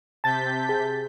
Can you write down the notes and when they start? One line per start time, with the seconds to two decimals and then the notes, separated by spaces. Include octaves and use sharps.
0.24 C3 A5 G6 A6 B6
0.69 G#4